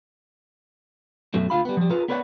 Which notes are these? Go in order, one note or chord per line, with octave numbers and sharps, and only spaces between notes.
F#2 B2 F#3 A3
D2 F4 F5 B5
G3 B3
F3 G3
F4 G#4 A#4 B4
B3 A#4 B4 C#5 D5 F#5